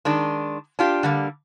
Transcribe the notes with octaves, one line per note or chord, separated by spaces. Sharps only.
D#3 G#3 D4
D4 F4 G4
D3 G3 A#3